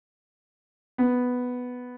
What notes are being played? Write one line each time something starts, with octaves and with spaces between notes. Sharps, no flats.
B3